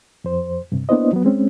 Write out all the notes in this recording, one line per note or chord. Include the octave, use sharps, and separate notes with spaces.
F2 C5
G2 C3
A#3 B3 D4 E4 C5 D#5
F#3 B3
G#3 C4 C#4